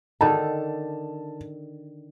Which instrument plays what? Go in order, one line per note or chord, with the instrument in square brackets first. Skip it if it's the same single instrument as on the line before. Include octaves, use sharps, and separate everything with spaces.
[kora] D3 D#3 A4 [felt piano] A5